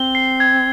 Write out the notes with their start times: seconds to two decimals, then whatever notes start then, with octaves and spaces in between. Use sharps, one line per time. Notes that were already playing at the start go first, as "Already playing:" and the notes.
Already playing: C4 G7
0.15 C7
0.40 G#6